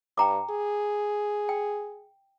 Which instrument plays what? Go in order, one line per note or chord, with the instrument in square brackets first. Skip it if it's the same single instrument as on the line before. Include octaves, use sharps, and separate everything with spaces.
[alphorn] G2 [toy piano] G5 A#5 D6
[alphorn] G#4
[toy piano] G5